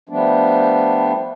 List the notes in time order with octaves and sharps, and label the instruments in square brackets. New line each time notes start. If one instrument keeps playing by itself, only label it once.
[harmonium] F3 G3 A3 B3 D4